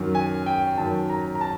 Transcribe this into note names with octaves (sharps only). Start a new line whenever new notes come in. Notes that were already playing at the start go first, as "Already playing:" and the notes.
Already playing: F#2 D#3 F#3
G#5
G5
F#2 D#3 F#3 A5
A#5
A#5
A5